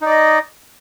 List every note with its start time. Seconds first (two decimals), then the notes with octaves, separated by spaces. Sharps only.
0.01 D#4
0.06 D5
0.11 D#5